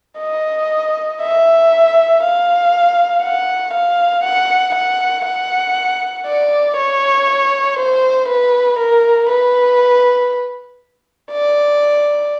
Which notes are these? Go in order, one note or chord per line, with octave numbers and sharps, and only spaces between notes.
D#5
E5
F5
F#5
F5
F#5
F#5
F#5
D5
C#5
C5
B4
A#4
B4
D5